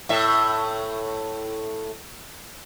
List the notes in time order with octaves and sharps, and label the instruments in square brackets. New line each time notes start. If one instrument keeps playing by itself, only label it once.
[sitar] A2 E5